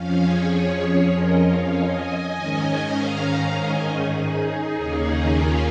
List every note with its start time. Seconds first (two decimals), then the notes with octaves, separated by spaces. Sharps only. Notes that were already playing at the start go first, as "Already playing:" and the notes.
Already playing: F2 F3 C#4 F5
0.24 G#4 C#5
0.54 G#4 C#5
1.14 A#4 D#5
1.44 C#5 F5
1.75 D#5 G#5
2.34 G#2 D#3 C#4
2.95 F5 A#5
3.56 D#5 G#5
3.86 D#4 G#4
4.76 D#2 C#3 A#3 C#4
5.37 C#4 F4